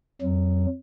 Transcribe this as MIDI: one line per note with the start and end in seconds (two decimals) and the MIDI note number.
0.22 0.66 41
0.22 0.66 54